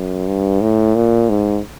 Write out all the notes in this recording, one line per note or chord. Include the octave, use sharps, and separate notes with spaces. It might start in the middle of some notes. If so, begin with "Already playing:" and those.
Already playing: F#2
G2
A2
A#2
G#2